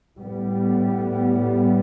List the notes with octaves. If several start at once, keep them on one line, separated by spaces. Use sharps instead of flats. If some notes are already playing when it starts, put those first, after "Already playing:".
A2 G3 B3